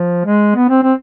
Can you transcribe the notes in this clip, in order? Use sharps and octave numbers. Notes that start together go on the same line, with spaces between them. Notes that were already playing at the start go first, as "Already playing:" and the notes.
Already playing: F3
G#3
B3
C4
C4